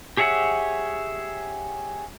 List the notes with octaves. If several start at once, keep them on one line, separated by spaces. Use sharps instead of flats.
G4 G#4 C#5 E5 F#5